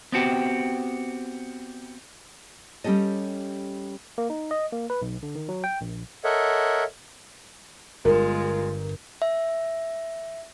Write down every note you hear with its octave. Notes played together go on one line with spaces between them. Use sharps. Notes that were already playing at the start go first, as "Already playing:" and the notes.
B3 C4 F#4 G4
G3 C#4 G4 A4 D#5
A#3
D#4
D#5
A#3
B4
B1
D3
D#3
F#3
G5
A#1
A4 A#4 C#5 D#5 E5 F#5
G1 G2 G#3 F4 A#4
E5